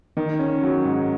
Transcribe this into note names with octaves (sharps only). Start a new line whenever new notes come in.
D#3
C#4
F#3
G#2